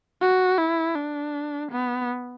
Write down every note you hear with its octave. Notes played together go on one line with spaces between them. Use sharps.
F#4
E4
D4
B3